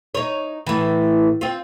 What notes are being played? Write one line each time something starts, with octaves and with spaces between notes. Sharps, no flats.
D#4 C#5
A2 E3
C4 F4